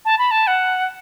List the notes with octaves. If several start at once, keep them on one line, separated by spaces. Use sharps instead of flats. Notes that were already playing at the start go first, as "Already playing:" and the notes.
A5
B5
A5
F#5